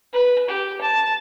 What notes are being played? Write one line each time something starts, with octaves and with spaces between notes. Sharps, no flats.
B4
G4
A5